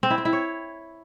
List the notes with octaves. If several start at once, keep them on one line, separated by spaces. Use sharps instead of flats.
C4
E4
C4
E4
C#5